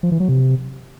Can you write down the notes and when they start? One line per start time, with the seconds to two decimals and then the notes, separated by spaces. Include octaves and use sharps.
0.03 F3
0.12 E3
0.20 F#3
0.28 C3